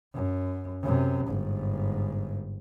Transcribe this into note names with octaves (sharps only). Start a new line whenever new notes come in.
F#2
F#2 C3
G1 G#2